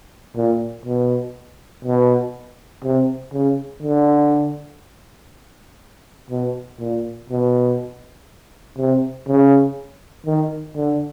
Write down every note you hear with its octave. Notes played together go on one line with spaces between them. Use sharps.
A#2
B2
B2
C3
C#3
D3
B2
A#2
B2
C3
C#3
D#3
D3